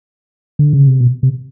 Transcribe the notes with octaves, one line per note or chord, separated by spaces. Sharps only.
D3
C#3
C3
B2
C3